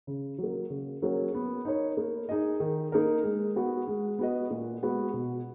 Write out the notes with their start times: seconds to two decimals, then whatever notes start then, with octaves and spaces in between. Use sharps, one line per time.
0.07 C#3
0.38 F#3
0.43 A#3
0.70 C#3
1.02 F#3 A#3 C#4 G#4
1.34 B3
1.65 D#4 A#4 C#5
1.97 A#3
2.29 D#4 G#4 D#5
2.60 D#3
2.92 A#3 D#4 A#4
3.24 G#3
3.56 B3 F#4
3.87 G#3
4.19 B3 F#4 B4 D#5
4.50 A#2
4.82 G#3 B3 F#4 B4
5.14 B2